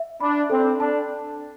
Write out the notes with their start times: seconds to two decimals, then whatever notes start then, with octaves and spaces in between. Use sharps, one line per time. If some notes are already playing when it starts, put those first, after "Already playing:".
Already playing: E5
0.20 D4 B5
0.50 C4 A4
0.79 D4 A5